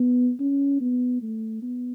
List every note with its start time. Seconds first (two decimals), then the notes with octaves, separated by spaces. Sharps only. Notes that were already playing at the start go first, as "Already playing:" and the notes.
Already playing: B3
0.39 C#4
0.81 B3
1.22 A3
1.62 B3